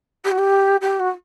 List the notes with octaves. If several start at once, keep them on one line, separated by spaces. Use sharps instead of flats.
G4
F#4
G4
G4
F#4